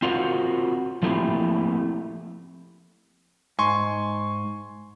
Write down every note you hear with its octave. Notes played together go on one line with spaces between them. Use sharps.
C4 F4 F#4 A#4 C5
F3 A3 A#3 C4 E4 G4
G#2 G#5 C6 C#6